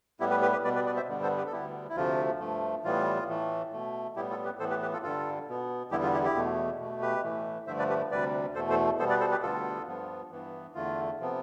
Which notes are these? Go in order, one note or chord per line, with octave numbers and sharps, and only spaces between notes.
A2 G3 B3 E4 G4
G4 B4
G4 B4
G4 B4
B2 G3 B3 B4 D5
B4 D5
B4 D5
C5 E5
G2 D3 G3 B3
A4 C5
G4 B4
A4
D2 D3 G3 B3 E4 G4
E4
D2 C3 F3 A3 F4
G2 F3 A3
A2 E3 G3 B3 F4
A2 E3 A3
B2 A3
A2 G3 B3 E4 G4
F4 A4
G4 B4
A2 E3 B3 A4 C5
G4 B4
G4 B4
F4 A4
G2 D3 G3 F4 A4
B2 B3
E2 D3 G3 B3 E4 G4
F4
E4 G4
E4 G4
E2 B2 A3
B2 A3
G4 B4
A2 E3 A3
G2 D3 F3 A3 C5 E5
B4 D5
G4 B4
D2 C3 G3 B4 D5
E2 B2 A3 A4 C5
A4 C5
B2 G3 B3 A4 C5
B4 D5
A4 C5
G4 B4
D2 D3 G3 B3 F4 A4
G2 F3 B3
G2 E3 B3
E2 D3 A3 F4
C3 F3 B3